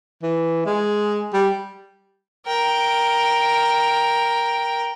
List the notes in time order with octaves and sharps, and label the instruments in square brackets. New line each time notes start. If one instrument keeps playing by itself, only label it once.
[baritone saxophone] E3
G#3
G3
[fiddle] A#4 G5